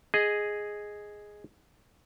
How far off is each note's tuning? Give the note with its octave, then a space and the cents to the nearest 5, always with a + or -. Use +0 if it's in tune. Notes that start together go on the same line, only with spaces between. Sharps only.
G#4 +0 D#5 +0